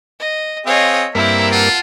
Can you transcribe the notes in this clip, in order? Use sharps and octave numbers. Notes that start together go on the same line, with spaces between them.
D#5
C4 G#4 C#5 D#5 F5
G2 A#3 C4 E4 A#4 E5
F4 F#5 A5